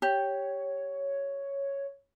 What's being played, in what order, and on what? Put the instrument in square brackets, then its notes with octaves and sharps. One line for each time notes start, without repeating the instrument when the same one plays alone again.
[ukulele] G4 [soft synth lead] C#5